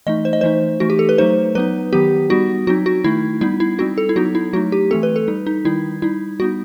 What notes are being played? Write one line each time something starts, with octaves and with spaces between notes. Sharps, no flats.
E3 A3 D#4 D#5
C5
D#5
E3 A3 D#4 C5
E3 A3 D#4 F#4
G4
A4
B4
F#3 A3 D#4 C5
F#3 B3 D#4 B4
D#3 F#3 B3 G4
G3 B3 D#4 F#4
F#3 C4 D#4 F#4
F#4
D#3 A3 D#4 E4
G3 B3 D#4 E4
E4
G3 C4 D#4 F#4
A4
E4
F#3 B3 D#4 F#4
E4
F#3 A3 D#4 F#4
G4
E3 A3 C4 A4
B4
A4
G3 D#4
D#4
D#3 G3 D#4 E4
G3 D#4 E4
G3 B3 D#4 F#4